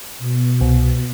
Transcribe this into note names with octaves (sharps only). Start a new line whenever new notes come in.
B2
C2